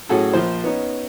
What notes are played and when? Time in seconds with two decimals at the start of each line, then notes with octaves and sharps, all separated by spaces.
0.09 A2 F#3 C#4 F#4 G#4 A4
0.33 A#1 F3 C5
0.64 B3 C#4 D#4